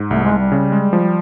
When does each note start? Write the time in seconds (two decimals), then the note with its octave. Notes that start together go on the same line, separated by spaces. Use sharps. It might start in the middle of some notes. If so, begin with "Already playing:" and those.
Already playing: G#2
0.11 C2 A3
0.24 G#3
0.31 C2
0.39 G3
0.52 C#3
0.72 G#3
0.93 F3